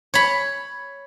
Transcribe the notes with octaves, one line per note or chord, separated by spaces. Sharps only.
C#5 B5